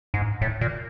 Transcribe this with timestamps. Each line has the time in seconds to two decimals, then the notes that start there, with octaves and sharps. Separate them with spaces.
0.14 G#2
0.41 A2
0.61 A#2